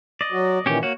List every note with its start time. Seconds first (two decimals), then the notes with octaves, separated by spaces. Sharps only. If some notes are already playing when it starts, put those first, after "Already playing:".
0.21 D5 D#5
0.32 F#3 F#4
0.66 A#2 D#3 E3 C#4 G4
0.83 A#3 F#4 C#5